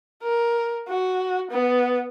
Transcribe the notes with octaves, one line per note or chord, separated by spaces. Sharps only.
A#4
F#4
B3